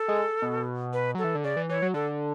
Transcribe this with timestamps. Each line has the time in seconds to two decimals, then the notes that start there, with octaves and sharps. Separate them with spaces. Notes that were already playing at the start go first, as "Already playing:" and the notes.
Already playing: A4
0.08 G#3
0.42 B2
0.93 B4
1.15 F#3 A4
1.24 E3
1.35 D3
1.44 C#3 D5
1.56 E3
1.69 E3 C#5
1.82 F#3
1.94 D3 A4